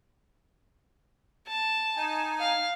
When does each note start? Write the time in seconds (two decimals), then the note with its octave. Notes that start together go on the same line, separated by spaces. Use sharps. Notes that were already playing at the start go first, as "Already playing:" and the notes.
1.47 A5
1.96 D#4 G#5
2.40 F5